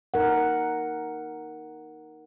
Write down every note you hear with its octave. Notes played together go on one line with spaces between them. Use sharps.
D#4 A#4 F#5